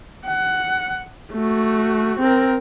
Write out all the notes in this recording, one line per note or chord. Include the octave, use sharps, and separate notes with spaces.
F#5
A3 F#4
C4 A#4